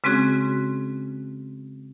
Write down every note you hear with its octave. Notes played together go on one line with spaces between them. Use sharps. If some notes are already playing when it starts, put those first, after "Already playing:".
C#3 G#3 C4 C#4 F#4 G#4